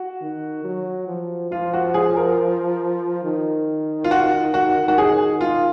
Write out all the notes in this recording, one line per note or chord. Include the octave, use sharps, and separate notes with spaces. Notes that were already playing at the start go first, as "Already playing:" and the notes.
Already playing: F#4
D#3
F#3
F3
F3 F4
F#4
G#4
A#4
D#3
F4
F#4
F#4
F#4
G#4
F4